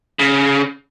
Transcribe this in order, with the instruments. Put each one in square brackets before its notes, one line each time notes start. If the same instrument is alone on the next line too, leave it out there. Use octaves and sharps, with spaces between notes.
[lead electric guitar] C#3